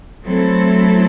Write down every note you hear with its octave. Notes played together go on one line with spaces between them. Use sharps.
F#3 A3 C4 E4 A4